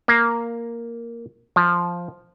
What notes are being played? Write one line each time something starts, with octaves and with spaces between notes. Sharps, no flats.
A#3
F3